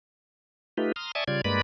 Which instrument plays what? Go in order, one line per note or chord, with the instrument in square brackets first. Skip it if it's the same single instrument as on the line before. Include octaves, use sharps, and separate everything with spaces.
[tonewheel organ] A3 D#4 F4 G4 B4
A#5 C6 D#6 F6
D5 E5 G#5 A5 C#6 D#6
C#3 G3 F4 D5 G#6
G2 G#3 A#3 B4 D5 B5